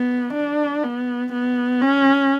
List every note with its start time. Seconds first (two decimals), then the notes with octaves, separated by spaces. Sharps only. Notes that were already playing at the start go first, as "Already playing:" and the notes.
Already playing: B3
0.34 D4
0.83 B3
1.33 B3
1.82 C#4